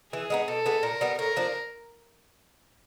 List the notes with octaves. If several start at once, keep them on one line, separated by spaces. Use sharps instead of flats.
E3 G#4
G#3 B3 D#4
B2 A4
G#3 B3 D4
A#2 A#4
G3 B3
A2 A#4
F3 A#3 D4